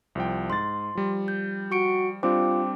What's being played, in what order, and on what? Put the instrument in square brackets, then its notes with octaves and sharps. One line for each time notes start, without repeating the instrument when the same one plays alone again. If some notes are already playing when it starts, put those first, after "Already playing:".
[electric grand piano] C2 F3 G5
[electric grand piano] G#2 A6 [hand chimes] C6
[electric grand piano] F3 G3
[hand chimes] G6
[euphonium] F#4 [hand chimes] C#6 C#7 D7
[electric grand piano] G3 C4 D4 [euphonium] F4 [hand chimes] C5 G5 D6